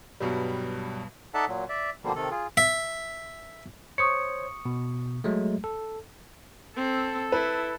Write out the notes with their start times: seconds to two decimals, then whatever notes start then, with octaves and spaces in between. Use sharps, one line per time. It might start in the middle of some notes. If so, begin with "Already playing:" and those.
0.20 G2 B2 F#3 G3
1.34 D#4 A4 D5 E5 F#5 A5
1.48 A#2 F#3
1.69 D5 E5
2.04 B2 D3 F3 G3 A#3
2.16 C3 D#3 A4
2.31 F4 G#4
2.57 E5
3.98 C5 C#5 C#6 D#6 C#7
4.65 B2
5.24 F#3 G#3 A3
5.64 A4
6.76 C4 A4
7.32 E4 B4